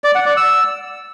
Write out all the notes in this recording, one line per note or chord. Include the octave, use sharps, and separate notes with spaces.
D5
F#5
D5
E6